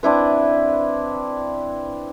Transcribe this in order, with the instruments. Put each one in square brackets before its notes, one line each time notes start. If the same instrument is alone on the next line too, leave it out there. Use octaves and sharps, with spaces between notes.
[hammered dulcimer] C4 D4 E4 B4